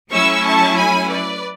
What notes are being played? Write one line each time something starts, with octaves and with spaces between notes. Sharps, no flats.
F#3 A3 C#4 E4 C#6 E6
A5 C#6
G#5 B5
B4 D5